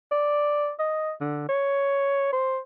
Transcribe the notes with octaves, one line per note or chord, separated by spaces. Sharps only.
D5
D#5
D3
C#5
C5